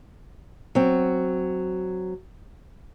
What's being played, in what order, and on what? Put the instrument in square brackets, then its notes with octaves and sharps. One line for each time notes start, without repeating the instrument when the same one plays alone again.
[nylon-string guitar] F#3 C4